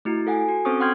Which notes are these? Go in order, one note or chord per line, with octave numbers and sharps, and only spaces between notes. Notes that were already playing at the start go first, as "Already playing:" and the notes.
A3 E4 F#4
A4 F#5 G#5
F#4
C4 C#4 A4 C5 C#6 D#6
F#5 G5 C6 F6 G6 G#6